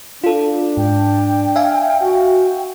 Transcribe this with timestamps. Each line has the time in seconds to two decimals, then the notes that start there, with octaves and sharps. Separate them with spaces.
0.24 D4 F4 A4
0.77 G#2 G5
1.56 E5 F5 G#5
2.02 F#4